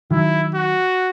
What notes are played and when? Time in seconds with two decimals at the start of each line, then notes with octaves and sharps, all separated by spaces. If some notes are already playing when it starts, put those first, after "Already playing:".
0.11 D#3 F#3 E4
0.55 F#4